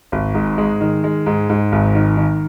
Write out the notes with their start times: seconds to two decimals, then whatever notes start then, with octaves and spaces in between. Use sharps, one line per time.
0.12 G#1
0.35 G#2
0.58 G#3
0.81 D#3
1.04 G#3
1.26 G#2
1.50 G#2
1.72 G#1
1.95 D#3
2.17 D#3